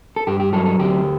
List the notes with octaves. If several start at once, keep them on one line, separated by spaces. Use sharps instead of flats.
A4
G2 G4
G4
F#3 A4
A4
D2 G4